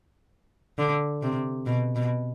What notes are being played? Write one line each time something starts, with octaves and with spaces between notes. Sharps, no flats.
D3
C3
B2
B2